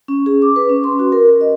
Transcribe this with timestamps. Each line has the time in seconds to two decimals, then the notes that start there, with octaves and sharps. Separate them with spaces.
0.08 C#4
0.26 G#4
0.42 D6
0.56 B4
0.69 C#4
0.84 C6
0.99 F#4
1.12 A#4
1.30 A#4
1.41 D#5